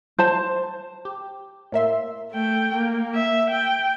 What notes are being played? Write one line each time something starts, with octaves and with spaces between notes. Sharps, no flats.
C5 A5
G4
A2 A#3 E5 C6
A3 G5
A#3
E5
G5